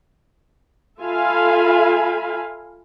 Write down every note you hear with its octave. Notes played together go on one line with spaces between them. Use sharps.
F4 A4 E5 F5 G#5 B5